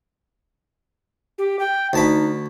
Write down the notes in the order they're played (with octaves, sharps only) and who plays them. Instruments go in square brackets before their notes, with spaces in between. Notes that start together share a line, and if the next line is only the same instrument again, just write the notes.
[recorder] G4
G5
[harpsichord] D2 A5 B5 [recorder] D#4